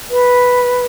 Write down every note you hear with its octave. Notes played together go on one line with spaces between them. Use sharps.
B4